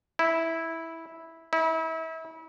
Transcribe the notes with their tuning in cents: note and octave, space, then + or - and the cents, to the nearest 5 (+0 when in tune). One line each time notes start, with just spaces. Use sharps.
E4 -10
E4 -35